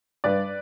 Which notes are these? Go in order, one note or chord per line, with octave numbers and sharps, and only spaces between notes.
G2 B4 D5